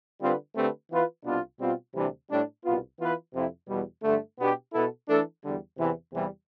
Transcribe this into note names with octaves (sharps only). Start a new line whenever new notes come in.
D3 G3 C4 F4 B4
D3 A3 C4 G4 B4
E3 B3 F4 B4
C2 B2 B3 D4 F4
B2 G3 C4 F4
D2 C3 E3 G3 D4
A2 G3 D4
C2 B2 B3 F4
E3 B3 F4 B4
F2 C3 F3 C4 E4
E2 B2 G3
G2 D3 A3
B2 B3 D4 G4
B2 B3 E4 A4
E3 A3 D4 A4
E2 D3 G3
E2 C3 E3
E2 C3 E3 G3